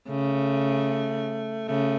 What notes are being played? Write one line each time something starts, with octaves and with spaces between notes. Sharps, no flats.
C#3 A3
C#3 A3